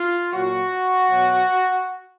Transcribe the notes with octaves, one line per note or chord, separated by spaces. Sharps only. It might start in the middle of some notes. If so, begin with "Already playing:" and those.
Already playing: F4
A#2 F#3 F#4
B2 F#3